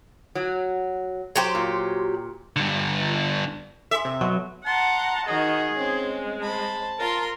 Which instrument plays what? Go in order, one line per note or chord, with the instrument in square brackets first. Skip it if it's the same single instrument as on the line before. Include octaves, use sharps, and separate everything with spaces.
[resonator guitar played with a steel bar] F#3
[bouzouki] F#3 G4 C5
[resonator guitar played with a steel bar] A#2
[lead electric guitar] G2 D3
[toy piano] A4 G#5 C6 [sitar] E5
[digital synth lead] C3
[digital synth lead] B2 [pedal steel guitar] F#3 [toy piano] F#4 C6 C#6
[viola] F#5 A#5 [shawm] A5 [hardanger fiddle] C6
[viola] D#3 D#5 [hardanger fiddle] F#4 [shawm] G#4
[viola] G#3 [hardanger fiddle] C4 C#4
[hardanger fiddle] C5 B5 [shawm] A5
[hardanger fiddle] F4 C6 [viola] A#4 A#5